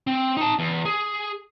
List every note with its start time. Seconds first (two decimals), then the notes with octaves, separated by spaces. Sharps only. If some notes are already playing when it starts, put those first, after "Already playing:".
0.07 C4
0.37 D#4 A5
0.59 E2
0.85 G#4